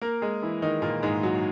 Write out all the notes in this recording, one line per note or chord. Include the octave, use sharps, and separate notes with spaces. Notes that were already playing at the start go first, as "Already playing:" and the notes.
A#3 A#4
G#3 G#4
E3 E4
D#3 D#4
A#2 A#3
G#2 G#3
F#3